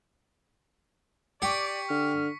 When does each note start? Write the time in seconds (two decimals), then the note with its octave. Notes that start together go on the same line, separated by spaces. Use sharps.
1.42 G4 D5 C#6 B6 C#7
1.90 D3 F6